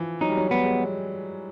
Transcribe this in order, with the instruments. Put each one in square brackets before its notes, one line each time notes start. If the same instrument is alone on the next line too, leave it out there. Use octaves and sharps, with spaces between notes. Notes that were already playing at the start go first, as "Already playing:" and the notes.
Already playing: [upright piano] E3 F3
[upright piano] F#3 [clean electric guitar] D#4
[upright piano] G3
F#3
[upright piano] G3 [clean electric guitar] B3
[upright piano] G#3